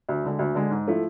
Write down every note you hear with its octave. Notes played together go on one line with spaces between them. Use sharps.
D2
D3 G#3
D2
D3 G#3
G#2
F3 A3 E4